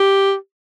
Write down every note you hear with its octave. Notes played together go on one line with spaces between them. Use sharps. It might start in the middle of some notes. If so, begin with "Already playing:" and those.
Already playing: G4